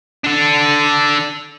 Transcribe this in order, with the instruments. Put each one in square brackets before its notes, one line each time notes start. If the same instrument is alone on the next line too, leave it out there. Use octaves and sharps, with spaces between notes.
[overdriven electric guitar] D4 A4